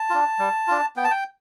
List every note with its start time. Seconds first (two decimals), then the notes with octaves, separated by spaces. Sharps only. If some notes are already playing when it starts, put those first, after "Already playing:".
Already playing: A5
0.10 D4 F4
0.39 G3
0.67 D4 F4
0.96 B3 G5
1.04 A5
1.11 G5